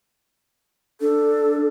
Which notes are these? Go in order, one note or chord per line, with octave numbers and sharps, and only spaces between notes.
D4 A4